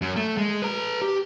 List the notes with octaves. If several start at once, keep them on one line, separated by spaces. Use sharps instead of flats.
F#2
A3
G#3
B4 A#5
G4